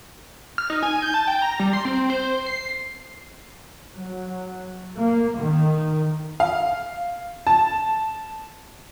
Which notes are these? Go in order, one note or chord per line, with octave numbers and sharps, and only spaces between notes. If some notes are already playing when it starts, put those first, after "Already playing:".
F6
D#4
G#5
G6
A5
G5
A#5
G3
C6
C4
C5
C7
F#3
A#3
D#3
F5
A5